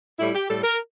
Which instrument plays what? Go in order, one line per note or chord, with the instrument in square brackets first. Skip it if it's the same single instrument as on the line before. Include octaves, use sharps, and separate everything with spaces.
[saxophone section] A2 G3 E4
G4
A2 G3 A4
A#4